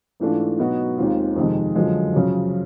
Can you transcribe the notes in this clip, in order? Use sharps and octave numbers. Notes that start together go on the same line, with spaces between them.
G#2 E3 A3 D4 F4
B2 F#3 B3 D#4 F#4
D#2 D#3 G#3 C4 F4
F2 C3 D#3 G#3
F#2 D3 F3 G#3
F#2 C#3 F3